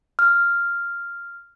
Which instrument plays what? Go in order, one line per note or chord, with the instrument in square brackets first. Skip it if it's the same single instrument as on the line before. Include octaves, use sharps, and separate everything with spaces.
[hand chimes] F6